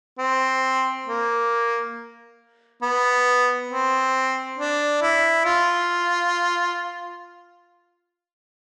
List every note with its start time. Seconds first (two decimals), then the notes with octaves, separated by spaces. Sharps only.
0.18 C4
1.06 A#3
2.82 B3
3.70 C4
4.58 D4
5.02 E4
5.45 F4